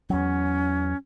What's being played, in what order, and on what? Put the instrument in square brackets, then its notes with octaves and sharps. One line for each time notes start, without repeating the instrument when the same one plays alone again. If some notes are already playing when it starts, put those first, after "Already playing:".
[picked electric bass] E2 F#3 [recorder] C#4